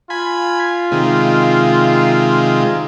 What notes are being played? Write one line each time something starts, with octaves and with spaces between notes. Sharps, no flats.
F4 G#5 B5
C3 D#3 G#3